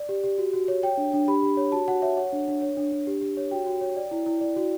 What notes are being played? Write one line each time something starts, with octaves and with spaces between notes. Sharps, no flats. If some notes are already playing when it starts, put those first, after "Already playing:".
Already playing: D5
G4
G4
F#4
F#4
C#5
C#5 G5
D4
D4
G4 B5
G4
C#5
F#4 A5
F#4 F#5
C#5 E5
C#5 F#5
D4
D4
C#5
D4
D4
G4
G4
C#5
F#4 G5
F#4
C#5
D5
E4
E4
D5
F#4